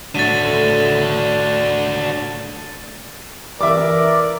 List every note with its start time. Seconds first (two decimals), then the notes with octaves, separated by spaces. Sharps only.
0.15 A2 A3 D4 F#4 A6 D#7
3.61 E3 A#4 D5 E5 D6